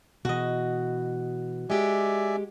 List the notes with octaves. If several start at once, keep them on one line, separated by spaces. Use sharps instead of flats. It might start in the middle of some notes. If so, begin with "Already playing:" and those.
B2 E3 F#4 D#5
G#3 G4 D5 E5 G#5